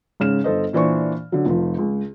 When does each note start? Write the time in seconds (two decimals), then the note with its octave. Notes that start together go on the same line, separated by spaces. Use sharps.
0.20 G#2 C#3 F6 E7
0.44 G1 A4 C5 D#5
0.73 A#2 E3 D4 C5 C#6
1.32 D3 F#3
1.45 F1 F3
1.78 C#2